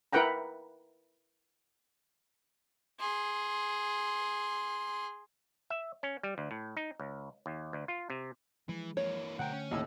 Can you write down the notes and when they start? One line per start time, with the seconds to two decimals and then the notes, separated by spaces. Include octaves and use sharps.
0.13 E4 A#4 B4 F#5 G5 A#5
2.99 G#4 C6
5.70 E5
6.03 C#4
6.23 G3
6.38 D2
6.51 A2
6.77 D#4
7.00 C#2
7.46 D#2
7.73 D2
7.88 F4
8.10 C3
8.69 E3 F3 G#3
8.97 E3 A#3 C#5
9.39 B1 D3 A3 A#4 F#5 G5
9.52 C#4
9.71 D#2 A2 E6